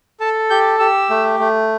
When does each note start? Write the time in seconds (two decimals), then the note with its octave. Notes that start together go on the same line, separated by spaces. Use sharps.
0.20 A4 A5
0.50 G4 G6
0.79 G4 E6
1.10 A3
1.39 A3